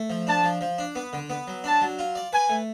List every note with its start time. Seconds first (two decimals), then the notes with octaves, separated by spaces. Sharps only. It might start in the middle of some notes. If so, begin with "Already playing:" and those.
Already playing: A3
0.10 F3
0.27 D4 A5
0.44 F3
0.61 F3
0.78 D4
0.95 B3
1.13 D3
1.30 B3
1.48 F#3
1.64 D4 A5
1.81 F#3
1.99 F4
2.15 D5
2.32 B4 G#5
2.49 A3